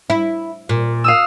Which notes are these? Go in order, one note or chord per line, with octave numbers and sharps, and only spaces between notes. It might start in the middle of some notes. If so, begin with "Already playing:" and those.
E4
A#2
F5 D#6 E6